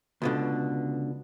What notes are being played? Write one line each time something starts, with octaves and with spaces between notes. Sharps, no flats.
C#2 B2 D3